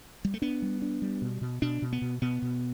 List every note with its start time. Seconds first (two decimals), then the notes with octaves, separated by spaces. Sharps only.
0.25 G3
0.34 A3
0.42 B3 D4
0.62 G3
0.82 D4
1.02 G3
1.22 B2
1.42 B2
1.62 B2 D4
1.82 B2
1.93 B3
2.02 B2
2.22 B2 B3
2.42 B2